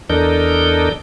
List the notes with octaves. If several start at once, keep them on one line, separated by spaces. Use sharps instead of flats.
E2 D4 A4 A#4 D#5 G6